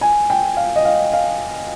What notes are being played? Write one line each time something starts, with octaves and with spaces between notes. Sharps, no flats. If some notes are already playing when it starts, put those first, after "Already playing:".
G#5
G5
F5
D#5
F5
F5